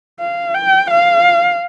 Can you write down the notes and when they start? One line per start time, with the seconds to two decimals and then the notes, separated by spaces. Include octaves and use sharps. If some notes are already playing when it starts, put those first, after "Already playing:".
0.20 F5
0.54 G5
0.90 F5